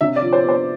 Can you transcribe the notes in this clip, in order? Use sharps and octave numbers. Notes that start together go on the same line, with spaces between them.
C3 E5
D5
F3
C5
B3
C5